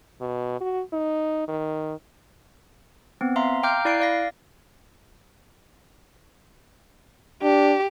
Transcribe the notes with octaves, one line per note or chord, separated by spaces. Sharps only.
B2
F#4
D#4
D#3
B3 C4
E5 F5 A#5 C6
F5 G5 A#5 D6 F6 G6
E4 D5 F5 F#6 C7 D7
D5 F5 A#6
D4 G4